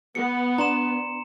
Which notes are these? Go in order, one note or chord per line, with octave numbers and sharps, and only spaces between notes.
B3 C#7
D4 A#5 C6 E7